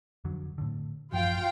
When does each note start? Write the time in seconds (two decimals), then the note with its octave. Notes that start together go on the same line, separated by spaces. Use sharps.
0.25 F2 D3 F#3
0.58 A2 D3
1.12 A1 F#2 F3 F4 F5 G5